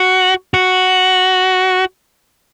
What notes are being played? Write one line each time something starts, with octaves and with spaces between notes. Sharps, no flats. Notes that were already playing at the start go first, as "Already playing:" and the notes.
Already playing: F#4
F#4